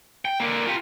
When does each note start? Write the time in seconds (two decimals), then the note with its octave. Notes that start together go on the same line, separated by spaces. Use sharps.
0.25 G5
0.40 D3 A#3
0.67 F4 G4